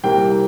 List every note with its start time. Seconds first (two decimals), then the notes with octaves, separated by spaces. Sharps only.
0.04 C2 C3 A#3 G5